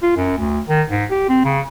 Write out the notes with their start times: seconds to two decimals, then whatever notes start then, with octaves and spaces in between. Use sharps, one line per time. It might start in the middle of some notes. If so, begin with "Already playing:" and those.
0.03 F4
0.16 F#2
0.37 D2
0.68 D#3
0.90 G#2
1.11 G4
1.29 C4
1.45 C#3